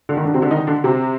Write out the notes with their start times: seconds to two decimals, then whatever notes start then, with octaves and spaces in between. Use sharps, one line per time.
0.09 D3
0.17 D#3
0.25 D3 D4
0.34 C3 C4
0.42 D3 D4
0.51 D#3 D#4
0.67 D3 D4
0.84 C3 C4